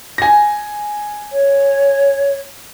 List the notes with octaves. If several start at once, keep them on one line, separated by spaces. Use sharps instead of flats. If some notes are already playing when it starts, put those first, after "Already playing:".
G#5 A#6
C#5